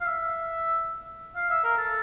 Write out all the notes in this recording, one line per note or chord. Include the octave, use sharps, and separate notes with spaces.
F5
E5
F5
E5
A#4
A4